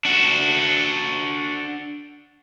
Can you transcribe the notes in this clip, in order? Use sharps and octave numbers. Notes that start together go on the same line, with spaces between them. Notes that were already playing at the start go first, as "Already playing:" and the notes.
D4 F#4